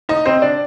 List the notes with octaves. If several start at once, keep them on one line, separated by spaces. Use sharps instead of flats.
D#4 D#5
C4 C5
D4 D5